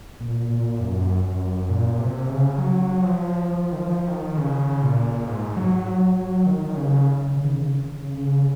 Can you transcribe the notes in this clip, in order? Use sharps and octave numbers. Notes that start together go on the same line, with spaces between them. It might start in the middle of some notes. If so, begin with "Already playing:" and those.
A#2
A#2
F#2
F#2
A#2
C3
C#3
F#3
F3
F3
D#3
F3
D#3
C#3
A#2
G#2
F#3
F#3
F#3
D#3
C#3
C#3
D#3
C#3
C#3